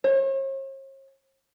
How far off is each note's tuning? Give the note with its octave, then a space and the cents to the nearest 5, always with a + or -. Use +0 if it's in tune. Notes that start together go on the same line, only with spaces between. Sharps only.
C#5 -45